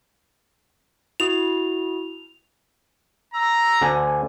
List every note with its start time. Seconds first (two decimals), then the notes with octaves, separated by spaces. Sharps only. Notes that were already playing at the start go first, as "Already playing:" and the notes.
1.20 E4 F#4 D#6 F7
3.34 A#5 E6
3.81 D2 D3 G#5